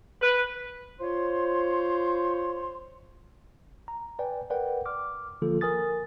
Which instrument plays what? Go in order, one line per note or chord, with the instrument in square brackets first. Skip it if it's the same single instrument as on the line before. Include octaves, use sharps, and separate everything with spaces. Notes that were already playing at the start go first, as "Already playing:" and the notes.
[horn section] B4
[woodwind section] F4 C5 C#5 C6
[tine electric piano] A#5
B4 D5 G5 G#5
A#4 B4 D5 F#5 G5
C6 D6 F6
D3 D#3 F3 A#3 F4 A4
A#4 G#5 D#6 A6